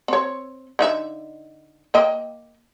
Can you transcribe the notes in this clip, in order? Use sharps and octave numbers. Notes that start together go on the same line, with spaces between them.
C4 C#5
D3 D#4 E5
A#3 D#5 G5